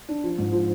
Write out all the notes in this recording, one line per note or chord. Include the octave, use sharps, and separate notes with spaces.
D4
F3
G#2
F3